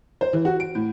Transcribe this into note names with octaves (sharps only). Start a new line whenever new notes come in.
C5
E3
F#4
D7
A2